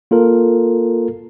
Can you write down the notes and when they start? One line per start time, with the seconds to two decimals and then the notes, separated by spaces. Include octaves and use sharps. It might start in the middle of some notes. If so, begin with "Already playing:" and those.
0.11 A#3 F4 A4 A#4